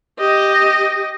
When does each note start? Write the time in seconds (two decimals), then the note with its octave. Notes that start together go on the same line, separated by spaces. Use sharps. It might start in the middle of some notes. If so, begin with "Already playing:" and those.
0.20 G4 D#5